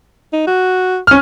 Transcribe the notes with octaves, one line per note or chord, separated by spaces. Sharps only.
D#4
F#4
C#4 F6